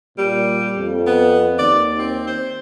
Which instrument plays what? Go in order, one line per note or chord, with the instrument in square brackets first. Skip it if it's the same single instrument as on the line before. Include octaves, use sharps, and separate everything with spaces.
[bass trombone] A#2 [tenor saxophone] G3
[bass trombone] F2
[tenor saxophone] B3
[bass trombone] D#2 [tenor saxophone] D5
[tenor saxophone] C4
C5